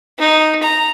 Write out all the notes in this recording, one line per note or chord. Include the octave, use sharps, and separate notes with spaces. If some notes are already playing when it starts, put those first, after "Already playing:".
D#4
A#5